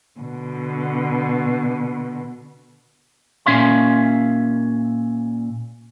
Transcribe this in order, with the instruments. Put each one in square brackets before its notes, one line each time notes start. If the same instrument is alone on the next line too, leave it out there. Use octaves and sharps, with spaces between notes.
[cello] B2 D3
[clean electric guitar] A#2 G3 C#4 E5 F5 C6